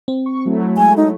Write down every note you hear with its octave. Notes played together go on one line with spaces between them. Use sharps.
C4
C#6
F#3 A3 E4
G#3 G#5
D#4